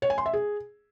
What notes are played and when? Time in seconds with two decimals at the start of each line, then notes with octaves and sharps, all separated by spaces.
0.02 C#5
0.10 G#5
0.18 C6
0.26 E5
0.33 G#4